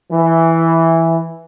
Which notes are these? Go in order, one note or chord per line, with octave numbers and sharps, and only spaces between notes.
E3